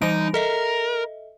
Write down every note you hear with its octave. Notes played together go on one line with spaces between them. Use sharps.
E3 G3 D#4 D7
A4 A#4 D#5 E5